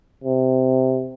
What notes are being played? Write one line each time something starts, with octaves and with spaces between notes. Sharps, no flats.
C3